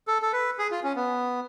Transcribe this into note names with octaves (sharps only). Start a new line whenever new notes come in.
A4
A4
B4
G#4
F4
C#4
B3